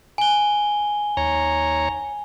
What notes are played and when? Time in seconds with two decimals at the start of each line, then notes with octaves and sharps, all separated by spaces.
0.18 G#5 G7
1.17 D#2 C#5 A#5